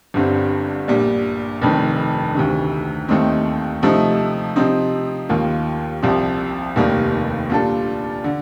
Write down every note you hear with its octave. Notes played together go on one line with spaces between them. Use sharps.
G1 G2 D3 G3 C4
A#1 A#2 G3
F1 F2 D#3
D2 C3 D#3
D#2 D#3 A3 C4 D#4
C3 F3 A3 D#4
C3 F3 C4 D#4
D#2 D#3 A#3 F4
C2 C3 F3 C4
F1 D#2 D#3 G3 A#3
A#2 G3 D4 F4 A4
D3